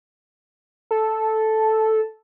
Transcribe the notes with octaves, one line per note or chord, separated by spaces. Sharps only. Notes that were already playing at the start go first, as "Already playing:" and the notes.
A4